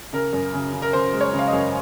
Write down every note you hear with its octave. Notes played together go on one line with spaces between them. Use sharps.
C#3 A#4
F#2
C#3
C#3
A#4
C#3 C5
G#3
C#5
C#3
F5
D#5
F#2